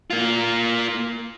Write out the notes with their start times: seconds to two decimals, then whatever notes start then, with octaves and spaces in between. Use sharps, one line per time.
0.10 A#3 F4